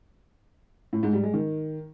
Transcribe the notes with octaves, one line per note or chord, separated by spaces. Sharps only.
A2
G#2
G3
G#3
D#3